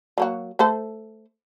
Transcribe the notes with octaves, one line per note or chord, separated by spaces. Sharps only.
F#3 A#3 F#4
A3 A4 C5